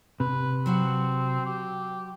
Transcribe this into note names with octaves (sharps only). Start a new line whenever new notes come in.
C3 B4
F#3 C4 F#4 F#5
G4